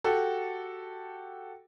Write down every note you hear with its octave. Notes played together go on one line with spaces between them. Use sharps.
F#4 G4 A4